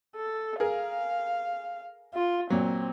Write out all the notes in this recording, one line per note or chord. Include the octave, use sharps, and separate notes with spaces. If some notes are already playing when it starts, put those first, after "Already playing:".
A4
G#4 A#4 F5
F4
A#2 F#3 C4